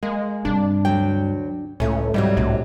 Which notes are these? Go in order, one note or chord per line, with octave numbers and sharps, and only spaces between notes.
G#3 A#3
G2 C3 D4
D2 F#3 G5
C#2 A2 A3 C#4
G#2 C3 E3 F#3 G3
C2 A2 D4